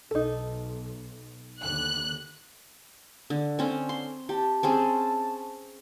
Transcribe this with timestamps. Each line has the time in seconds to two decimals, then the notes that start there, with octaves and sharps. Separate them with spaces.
0.11 B1 D#4 A4
1.62 D#2 D3 F#6
3.30 D3
3.59 D3 C4 C#4
3.89 C6
4.29 G4 A5
4.63 C4 C#4 G#4